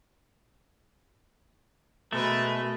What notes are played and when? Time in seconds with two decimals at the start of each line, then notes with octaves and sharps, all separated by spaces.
2.13 B2 G#3 A3 A#4 B4